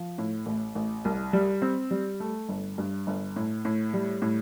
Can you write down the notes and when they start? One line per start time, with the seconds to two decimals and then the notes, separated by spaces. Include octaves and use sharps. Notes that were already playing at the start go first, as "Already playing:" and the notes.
Already playing: F3
0.18 A2
0.46 A1
0.75 A1
1.05 C2
1.33 G3
1.62 C4
1.91 G3
2.20 A3
2.49 G1
2.78 G2
3.07 G1
3.36 A2
3.65 A2
3.94 G3
4.22 A2